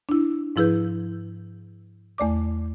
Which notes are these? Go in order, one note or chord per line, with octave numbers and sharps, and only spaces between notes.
D4 E4
G#2 F3 E4 G#4 B4 G6
E2 A3 D5 D6